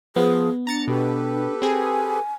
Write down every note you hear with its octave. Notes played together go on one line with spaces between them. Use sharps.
F3 B3 G#4
D4 A#5 A6 C#7
B2 G4 A4 B4
C4 G#4 G#5